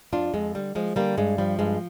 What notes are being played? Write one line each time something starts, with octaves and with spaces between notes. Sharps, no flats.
F2 D4 F4
F2 G#3
D3 G3
F3 G#3
D3 G3 A#3
G2 G#3
F3 G3
G2 G#3